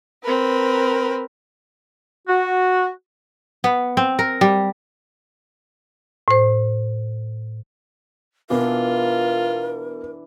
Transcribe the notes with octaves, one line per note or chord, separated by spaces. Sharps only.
C4 A#4 B4
F#4
B3
C4
A#4
G3
A2 C5
B2 E3 B3 D4 F4 A#4